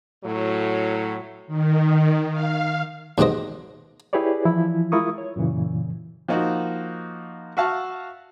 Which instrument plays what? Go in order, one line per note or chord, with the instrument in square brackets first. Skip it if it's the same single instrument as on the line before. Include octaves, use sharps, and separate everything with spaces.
[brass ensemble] A2 F#3
[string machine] D#3
F5
[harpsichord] D#2 G#2 B2 C4 D#5
[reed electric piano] E4 G4 G#4 B4 C#5 D5
E3 F3 E4
G#3 E4 F4 A#4 C#6 D#6
C#5
F#2 A#2 C#3 E3
[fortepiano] F3 A#3 D#4 F#4
F#4 E5 F5 A5 C#6